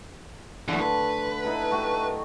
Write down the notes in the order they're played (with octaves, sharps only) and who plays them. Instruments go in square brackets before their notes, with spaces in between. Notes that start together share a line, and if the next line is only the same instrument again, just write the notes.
[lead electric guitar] F#2 E3 [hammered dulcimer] D3 A3
[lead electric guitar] B4
[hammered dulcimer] D#4 E4 A4
A3 F#4 G4